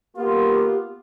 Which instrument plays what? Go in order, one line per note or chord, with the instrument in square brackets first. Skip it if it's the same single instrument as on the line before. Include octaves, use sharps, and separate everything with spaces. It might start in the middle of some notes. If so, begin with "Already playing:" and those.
[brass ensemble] A#3 B3 F4 [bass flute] G4